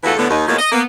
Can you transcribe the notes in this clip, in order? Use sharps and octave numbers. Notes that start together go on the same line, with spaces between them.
E2 D3 E3 F4 F#4 A4
A2 D3 B3
D#2 D#4
A2 F3 F#3 G#3 A#3 B3
D#5
A#3 B3